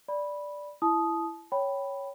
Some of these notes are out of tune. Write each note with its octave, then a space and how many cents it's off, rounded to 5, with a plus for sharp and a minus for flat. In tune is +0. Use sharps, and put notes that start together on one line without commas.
D5 +0 B5 -10
E4 +15 A5 -30 D#6 +0
C#5 +0 G5 -10 B5 +0